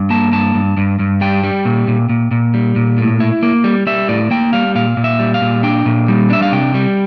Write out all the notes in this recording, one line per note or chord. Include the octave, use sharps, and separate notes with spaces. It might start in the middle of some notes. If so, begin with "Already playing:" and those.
Already playing: G2
A#3 A5
G2 A5
G2
G2
G2
G3 G5
G3
A#2
A#2
A#2
A#2
G3
A#2
A2
E4
A#3
G3
G3 E5
A2 D5
A#3 G5
G3 F5
A#2 F5
A#2
E5
G3
F5
A#2
D4 G5
A#2
G3
D4 E5
F5
C3 G5
G3